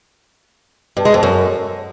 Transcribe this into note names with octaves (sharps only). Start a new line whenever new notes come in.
G2
G#3
F2
F#2